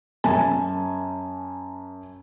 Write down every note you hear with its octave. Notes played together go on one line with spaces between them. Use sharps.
F#2 G#5 A5